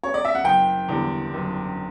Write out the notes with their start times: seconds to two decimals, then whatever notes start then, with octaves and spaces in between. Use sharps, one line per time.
0.03 C#5
0.14 D5
0.25 E5
0.35 F#5
0.44 F#1 G5
0.89 E2 D3 G3
1.34 F#1